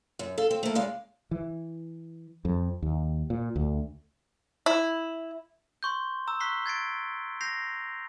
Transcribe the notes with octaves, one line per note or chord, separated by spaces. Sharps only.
F#2
A4 F5
C4
A3 A#3
E2 C#3 G#3 D5 F5
E3
F2
D#2
A#2
D2
E4
C6 C#6 G6
A#5 E6
C#6 F#6 B6 C7 G7
G#6 A6 C7 D7
G6 A#6 C7 F7